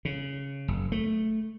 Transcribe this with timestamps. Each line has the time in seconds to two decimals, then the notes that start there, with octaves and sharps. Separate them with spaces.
0.05 C#3
0.68 F#1
0.92 A3